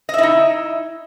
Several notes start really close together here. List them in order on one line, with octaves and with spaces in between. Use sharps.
D#5 E5 E4 D#4